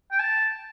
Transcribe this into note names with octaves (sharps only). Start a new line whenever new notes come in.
G5
A5